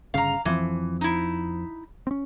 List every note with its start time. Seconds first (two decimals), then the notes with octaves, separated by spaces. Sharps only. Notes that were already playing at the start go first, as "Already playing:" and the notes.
0.14 G1 C#3 F5 A#5
0.45 F2 E3 F3 C4
1.01 D#4 E4
2.07 C4 C#4